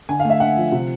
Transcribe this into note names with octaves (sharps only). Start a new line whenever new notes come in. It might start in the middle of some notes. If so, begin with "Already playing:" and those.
D3 G#5
F5
A3
E5
D3 F#5
F3
C3